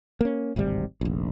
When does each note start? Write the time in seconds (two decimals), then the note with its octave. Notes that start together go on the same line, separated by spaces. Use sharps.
0.21 A#3 C#4
0.56 D1 G#1 C3 G3
1.01 F1 A#1